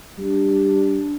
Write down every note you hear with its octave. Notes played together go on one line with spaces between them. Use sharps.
G3 D4